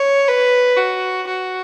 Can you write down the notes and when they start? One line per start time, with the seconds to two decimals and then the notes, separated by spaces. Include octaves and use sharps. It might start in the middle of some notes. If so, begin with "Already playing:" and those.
Already playing: C#5
0.28 B4
0.77 F#4
1.27 F#4